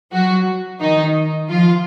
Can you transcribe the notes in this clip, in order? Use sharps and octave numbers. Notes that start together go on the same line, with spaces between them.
F#3 F#4
D#3 D#4
F3 F4